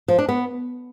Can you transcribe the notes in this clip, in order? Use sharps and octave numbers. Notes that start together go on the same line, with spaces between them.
F3
D4
B3